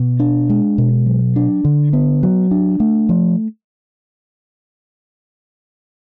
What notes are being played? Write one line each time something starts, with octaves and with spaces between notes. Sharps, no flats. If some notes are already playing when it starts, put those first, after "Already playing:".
Already playing: B2
D4
G#3
B2
F#3
D4
D3
B3
F#3
D4
A3
F3